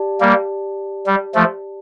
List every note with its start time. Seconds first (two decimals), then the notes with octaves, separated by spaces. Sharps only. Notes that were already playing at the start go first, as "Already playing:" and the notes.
Already playing: G4 D5 A5
0.20 G3 A#3
1.06 G3
1.35 F3 A3